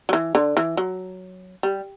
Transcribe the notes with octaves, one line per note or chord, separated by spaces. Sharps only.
F#3
E3
D3
E3
F#3
G3